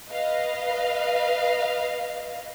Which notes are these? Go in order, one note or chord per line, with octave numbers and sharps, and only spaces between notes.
B4 D#5 F5